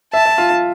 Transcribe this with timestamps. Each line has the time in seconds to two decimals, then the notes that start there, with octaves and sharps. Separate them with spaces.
0.13 E5 A5
0.26 E5
0.38 F4
0.50 F4